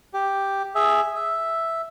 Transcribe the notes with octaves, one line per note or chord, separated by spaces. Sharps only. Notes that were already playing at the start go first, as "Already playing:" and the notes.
G4
G#4 E5
E5